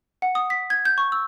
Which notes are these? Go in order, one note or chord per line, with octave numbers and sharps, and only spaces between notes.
F#5
D#6
B6
G#6
G6
C#6
E6